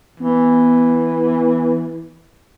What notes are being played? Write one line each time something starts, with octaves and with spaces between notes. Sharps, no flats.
E3 B3